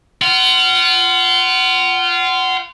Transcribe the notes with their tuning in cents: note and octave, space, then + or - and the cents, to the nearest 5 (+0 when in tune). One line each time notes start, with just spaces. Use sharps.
F4 -15 F#5 +25